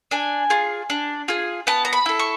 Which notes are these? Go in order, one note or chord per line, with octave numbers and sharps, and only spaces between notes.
D4 G#5
F4 G#4
D4
F4 G#4
B3 A5
A#5
B5
E4 A4
C#6